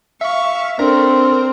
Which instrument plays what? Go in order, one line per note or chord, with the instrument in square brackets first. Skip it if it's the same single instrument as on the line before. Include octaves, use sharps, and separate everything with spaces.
[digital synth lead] E5 [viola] F5 C#6
[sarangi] C4 [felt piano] D4 [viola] A4 [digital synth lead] A#4